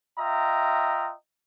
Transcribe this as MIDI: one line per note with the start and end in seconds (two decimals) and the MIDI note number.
0.17 1.12 65
0.17 1.12 75
0.17 1.12 76
0.17 1.12 79
0.17 1.12 82